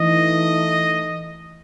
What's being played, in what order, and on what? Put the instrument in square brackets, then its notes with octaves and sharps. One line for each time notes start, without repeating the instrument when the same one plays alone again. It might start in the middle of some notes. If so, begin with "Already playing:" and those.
Already playing: [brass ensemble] E3 A3 D#4 D#5